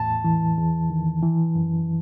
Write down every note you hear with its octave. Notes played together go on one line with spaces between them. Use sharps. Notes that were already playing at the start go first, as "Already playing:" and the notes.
Already playing: E2 A2 A5
E3
E2
D#3
E3
F#2